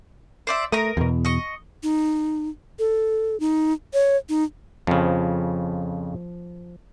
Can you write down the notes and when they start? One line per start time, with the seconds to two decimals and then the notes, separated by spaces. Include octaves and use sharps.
0.47 C5 D5 E5
0.72 A3 A#4 A#5 D#6
0.97 E2 B2
1.25 D#5 C#6
1.83 D#4
2.79 A4
3.40 D#4
3.93 C#5
4.29 D#4
4.87 F2 C#3 F3